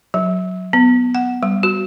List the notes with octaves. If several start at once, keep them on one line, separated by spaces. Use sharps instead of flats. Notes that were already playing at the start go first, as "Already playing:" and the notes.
F#3
B3
F#5
G3
F#4